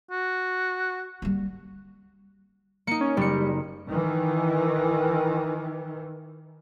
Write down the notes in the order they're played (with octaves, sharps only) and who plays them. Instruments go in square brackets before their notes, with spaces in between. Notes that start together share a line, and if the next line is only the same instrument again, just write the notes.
[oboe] F#4
[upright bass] G3 A#3
[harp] A#3 D#4 [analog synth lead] C#7
[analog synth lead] C#4
[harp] F#1 C#7 [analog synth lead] G3
[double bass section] D#3 E3